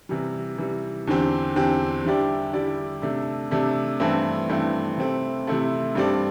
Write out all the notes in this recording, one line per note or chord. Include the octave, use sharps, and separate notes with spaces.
C3 E3 G3
C3 E3 G3
E2 D3 C4 G4
E2 D3 C4 G4
D3 G3 E4 G4 D5
D3 G3 E4 G4 D5
C3 A3 D4
C3 A3 D4
G2 E3 A3 C4 E4
G2 E3 A3 C4 E4
C3 A3 C4 E4 A4
C3 A3 C4 E4 A4
G2 G3 C4 A4 D5